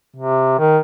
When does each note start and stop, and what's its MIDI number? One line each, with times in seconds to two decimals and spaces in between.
0.16 0.56 48
0.59 0.79 51